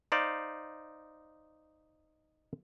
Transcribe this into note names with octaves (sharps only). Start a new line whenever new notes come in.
D#4 C5 D5 F5